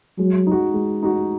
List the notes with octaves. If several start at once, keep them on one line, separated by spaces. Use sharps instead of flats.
F#3 G#3
D#4 F#4
G#3
D#4 F#4